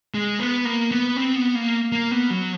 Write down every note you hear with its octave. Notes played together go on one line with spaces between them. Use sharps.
G#3
B3
A#3
B3
C4
B3
A#3
A#3
B3
F#3